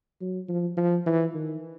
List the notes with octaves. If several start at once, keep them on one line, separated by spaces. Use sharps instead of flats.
F#3
F3
F3
E3
D#3